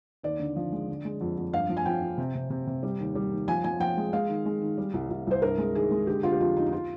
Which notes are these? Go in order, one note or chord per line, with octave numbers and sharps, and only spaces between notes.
D#2 D5
D3
F3
G#3
D3
G#3
F2
F2
G2 F5
F3
G#5
F3 G5
F3
C3
C3
C3
C3
G3
D#2
G3
D#2
F3 G#5
F3 G#5
F3 G5
G#3
G#3 F5
D#3
G#3
D#3
G3
C2
C2
C2 C5
G2 A#4
G#3
D#3 G#4
G#3
D3 G4
D3 F4
G4
F2 F4
F2 D#4
D#4
F4